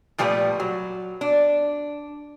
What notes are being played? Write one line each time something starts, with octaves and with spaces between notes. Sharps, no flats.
A#2 F3 G3 A3 B4
F#3
D4